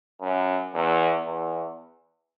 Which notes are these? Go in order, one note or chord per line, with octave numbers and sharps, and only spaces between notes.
F#2
E2
E2